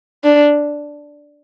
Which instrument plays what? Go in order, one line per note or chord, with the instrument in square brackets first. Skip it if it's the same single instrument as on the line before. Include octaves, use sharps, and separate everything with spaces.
[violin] D4